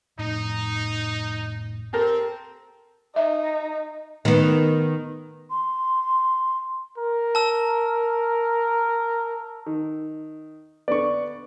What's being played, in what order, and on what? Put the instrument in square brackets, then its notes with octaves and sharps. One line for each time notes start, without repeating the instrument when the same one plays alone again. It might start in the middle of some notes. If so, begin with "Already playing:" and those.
[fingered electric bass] F1 A2 [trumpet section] D#4
[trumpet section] C4 [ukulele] G4 A4 A#4
[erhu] D#4 [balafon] E5
[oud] D#3 B3
[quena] C6
[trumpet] A#4
[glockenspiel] A5 E6
[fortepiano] D#3
[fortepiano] D3 B3 [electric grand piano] D5 C#6